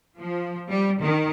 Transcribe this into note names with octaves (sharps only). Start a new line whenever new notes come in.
F3
G3
D#3